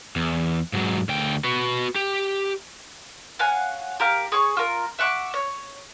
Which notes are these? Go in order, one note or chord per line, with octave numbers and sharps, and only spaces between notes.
E2
G#2 F#3
D2 G5
F#4 B4
G4
C#5 F5 F#5 G#5
G4 A#4 F5
G#4 C#5 C#6
F4 A#4
E5 F#5 C#6 D6
C#5